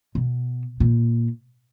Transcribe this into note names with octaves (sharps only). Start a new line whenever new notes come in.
B2
A#2